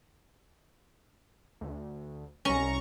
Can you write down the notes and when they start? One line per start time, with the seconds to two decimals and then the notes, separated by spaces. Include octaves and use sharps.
1.61 D2
2.45 C2 C#4 A#5 C#6